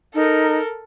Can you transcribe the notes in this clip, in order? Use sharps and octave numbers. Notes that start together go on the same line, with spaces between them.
D#4 A4 A#4